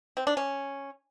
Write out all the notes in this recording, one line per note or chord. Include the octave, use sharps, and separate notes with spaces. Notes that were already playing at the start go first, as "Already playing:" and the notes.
C4
D4
C#4